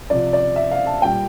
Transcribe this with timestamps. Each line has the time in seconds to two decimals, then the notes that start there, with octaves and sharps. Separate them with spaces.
0.10 C3 F3 D5
0.33 D5
0.56 E5
0.71 F5
0.86 A5
1.02 A#2 G3 G5